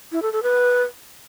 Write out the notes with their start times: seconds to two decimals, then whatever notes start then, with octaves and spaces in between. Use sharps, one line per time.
0.12 E4
0.22 A4
0.33 A4
0.43 B4